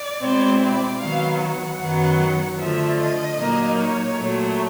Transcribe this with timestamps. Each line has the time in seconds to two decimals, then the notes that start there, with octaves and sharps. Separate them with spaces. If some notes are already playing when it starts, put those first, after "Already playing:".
Already playing: D5
0.22 B2 G#3 C4 E4
0.61 D5
1.01 D#3 F#3 B3 F5
1.40 F#5
1.80 F#2 D#3 F#3 B3
2.59 D3 F3 A3 E5
2.98 D#5
3.38 A#2 F#3 A#3 D#4
3.78 C#5
4.17 A#2 F#3 A3